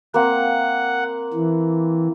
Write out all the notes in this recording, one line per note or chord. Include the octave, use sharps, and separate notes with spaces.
A#3 C4 F#5
E3